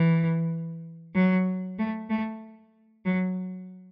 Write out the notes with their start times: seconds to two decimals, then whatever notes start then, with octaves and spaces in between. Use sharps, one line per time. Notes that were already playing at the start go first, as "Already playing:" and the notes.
Already playing: E3
1.15 F#3
1.79 A3
2.10 A3
3.06 F#3